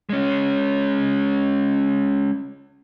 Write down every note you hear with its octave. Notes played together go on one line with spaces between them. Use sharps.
G#3 C#4